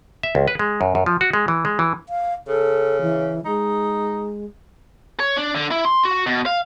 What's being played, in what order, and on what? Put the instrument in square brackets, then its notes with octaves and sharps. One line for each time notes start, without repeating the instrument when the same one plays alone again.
[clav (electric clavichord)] E5
C#2
B4
G#3
F#2
F#2
F3
F#4
G#3
E3
G#3
E3
[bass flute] F5
[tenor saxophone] C#3 [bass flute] A4
[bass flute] E3
[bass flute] G#3 [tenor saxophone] D#4
[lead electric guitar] C#5
D4
D3
E4
C6
F#4
B2
F5